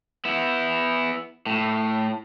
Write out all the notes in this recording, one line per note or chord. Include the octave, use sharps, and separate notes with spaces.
B3 E4
A2